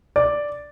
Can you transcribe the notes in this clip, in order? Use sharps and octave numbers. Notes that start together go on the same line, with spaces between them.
D5